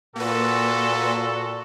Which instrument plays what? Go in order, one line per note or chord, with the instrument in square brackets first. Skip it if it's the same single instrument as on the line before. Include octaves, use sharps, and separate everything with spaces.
[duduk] A#2 [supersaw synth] A#3 B4 [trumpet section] F#4 A4